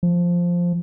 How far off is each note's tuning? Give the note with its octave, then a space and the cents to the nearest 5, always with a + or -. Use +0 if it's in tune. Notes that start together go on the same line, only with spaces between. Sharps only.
F3 +0